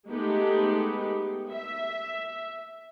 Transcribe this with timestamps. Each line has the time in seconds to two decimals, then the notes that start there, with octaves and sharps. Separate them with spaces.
0.10 G#3 A3 B3 D#4 G4
1.53 E5